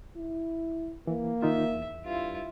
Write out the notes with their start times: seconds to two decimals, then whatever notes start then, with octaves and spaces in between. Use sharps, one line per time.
0.17 E4
1.07 E3 A#3
1.42 D#3 D#4 F4 E5
1.75 E2
2.05 G2 E4 F4